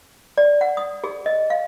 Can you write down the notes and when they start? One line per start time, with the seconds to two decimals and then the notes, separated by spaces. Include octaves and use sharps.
0.38 D5
0.61 F#5
0.77 D#6
1.04 G#4
1.26 D#5
1.50 F5